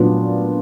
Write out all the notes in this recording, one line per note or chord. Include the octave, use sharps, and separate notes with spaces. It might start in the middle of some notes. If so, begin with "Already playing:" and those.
Already playing: A#2 F#3 B3 D4 F4